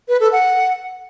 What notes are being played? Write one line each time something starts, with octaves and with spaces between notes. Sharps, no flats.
B4
A4
F#5